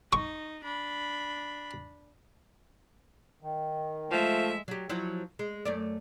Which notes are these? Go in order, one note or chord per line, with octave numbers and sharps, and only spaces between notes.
D#4 C#6
D4 B5
D#3
F3 G#3 A3 E5
F#3 G4
F3 F#3 E4
G#3
F#2 A3 D5